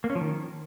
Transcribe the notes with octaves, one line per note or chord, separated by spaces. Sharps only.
A#3
C#4
F3
D#3